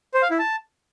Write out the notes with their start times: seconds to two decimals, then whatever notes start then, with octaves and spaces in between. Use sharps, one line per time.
0.14 C5
0.22 F5
0.31 E4
0.39 A5